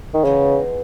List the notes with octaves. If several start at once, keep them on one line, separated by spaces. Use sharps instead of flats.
D#3
C#3 E3 G#3 B3 D#4